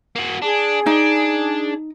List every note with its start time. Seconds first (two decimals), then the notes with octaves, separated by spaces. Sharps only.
0.16 A#3 F#4
0.42 D4 G#4
0.86 D4 D#4